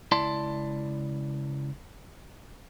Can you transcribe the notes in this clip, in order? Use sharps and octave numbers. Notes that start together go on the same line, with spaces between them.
C#2 E4 D5 A5 C6